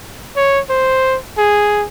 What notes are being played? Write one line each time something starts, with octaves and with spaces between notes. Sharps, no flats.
C#5
C5
G#4